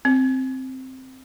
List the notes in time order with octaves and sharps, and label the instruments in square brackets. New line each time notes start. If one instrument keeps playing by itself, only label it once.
[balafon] C4